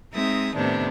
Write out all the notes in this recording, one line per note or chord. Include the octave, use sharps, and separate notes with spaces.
G#3 C4 D#4 E5 D#6
A2 C3 D#3 B3 D4